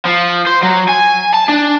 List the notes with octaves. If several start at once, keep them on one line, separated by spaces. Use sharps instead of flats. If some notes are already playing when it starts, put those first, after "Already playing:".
F3
C5
F#3
G#5
A5
D4